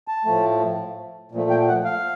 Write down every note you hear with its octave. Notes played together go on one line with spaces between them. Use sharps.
A5
A2 F3 A3
A#2 F3 A3
G5
F#5
F5